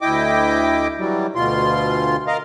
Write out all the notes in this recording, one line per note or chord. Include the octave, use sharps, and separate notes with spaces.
D2 E4 D#5 G5 D6
E3 F#3 G3
D2 B2 F4 C6
A#4 D#5 F5